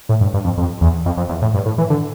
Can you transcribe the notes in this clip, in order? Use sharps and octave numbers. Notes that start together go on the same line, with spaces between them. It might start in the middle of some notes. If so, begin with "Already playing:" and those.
A2
G2
G2
F2
F2
E2
F2
F2
E2
A2
G2
A2
E3
D3